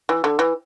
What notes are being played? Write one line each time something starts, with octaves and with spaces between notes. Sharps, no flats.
E3
D3
E3